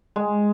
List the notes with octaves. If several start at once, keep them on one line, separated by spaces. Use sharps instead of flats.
G#3